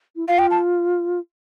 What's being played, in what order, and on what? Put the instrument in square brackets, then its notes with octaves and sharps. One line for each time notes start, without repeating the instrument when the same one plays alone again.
[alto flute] E4
[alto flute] F4 [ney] F5
[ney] G5
A5